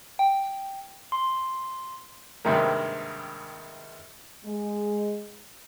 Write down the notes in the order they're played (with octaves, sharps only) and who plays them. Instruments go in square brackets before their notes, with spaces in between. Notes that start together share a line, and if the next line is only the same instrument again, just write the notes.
[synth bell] G5
[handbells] C6
[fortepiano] G#1 G2 C3 D#3 A#3
[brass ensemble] G#3